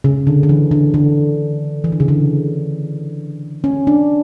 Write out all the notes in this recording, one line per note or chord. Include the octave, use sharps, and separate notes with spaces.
C#3
D3
D3
E3
D3
D3
E3
D3
C#3
D3
C#4
D4